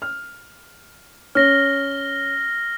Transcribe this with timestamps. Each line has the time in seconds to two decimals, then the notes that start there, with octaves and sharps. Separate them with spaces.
0.02 F6
1.35 C#4 F6 A#6 G7